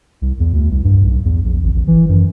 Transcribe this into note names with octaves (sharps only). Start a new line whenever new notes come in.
C2
E2
D2
C2
G2
B1
E2
A#1
G#1
A1
E3
F#2